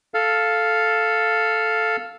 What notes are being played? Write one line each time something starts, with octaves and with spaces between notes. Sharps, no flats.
A4 F5